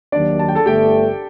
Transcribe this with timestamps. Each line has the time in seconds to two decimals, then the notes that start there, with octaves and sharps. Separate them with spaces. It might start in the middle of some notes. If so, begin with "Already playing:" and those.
0.12 D#2 D#3 F#3 D4 D5
0.39 A5
0.48 G5
0.55 A4 A5
0.66 G1 G2 D3 A3 G4 G5